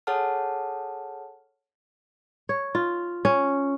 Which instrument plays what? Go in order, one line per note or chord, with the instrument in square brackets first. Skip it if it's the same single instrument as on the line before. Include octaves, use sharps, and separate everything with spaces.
[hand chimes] G#4 A4 C#5 F#5 A5 F6
[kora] C#5
F4
C#4